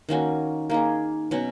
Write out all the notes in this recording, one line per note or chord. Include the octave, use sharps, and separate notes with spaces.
D#3 A#3 C#4 F#4
A#3 D#4 G#4
B2 F#3 C#4 F#4